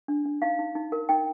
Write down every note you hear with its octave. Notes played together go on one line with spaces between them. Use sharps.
D4
D4
D#4 F5
D#4
D#4
A#4
D#4 G5